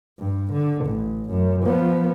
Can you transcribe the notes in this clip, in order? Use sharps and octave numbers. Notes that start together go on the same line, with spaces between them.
G2
D3
A1
F#2
F3 B3